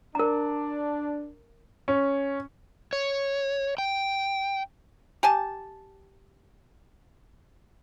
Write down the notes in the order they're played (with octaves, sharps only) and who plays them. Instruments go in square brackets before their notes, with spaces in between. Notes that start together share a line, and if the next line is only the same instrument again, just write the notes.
[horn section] D4 [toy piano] A#4 A#5
[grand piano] C#4
[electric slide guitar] C#5
G5
[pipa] G4 G#5 A5